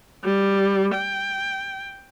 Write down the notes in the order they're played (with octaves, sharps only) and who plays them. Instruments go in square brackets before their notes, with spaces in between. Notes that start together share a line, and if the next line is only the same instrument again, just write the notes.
[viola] G3
G5